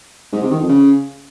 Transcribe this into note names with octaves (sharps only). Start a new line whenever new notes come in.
G#2
C3
D#3
F2
C#3